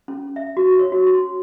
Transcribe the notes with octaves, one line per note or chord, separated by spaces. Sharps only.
C#4
E5
F#4
C#5
F#4
C6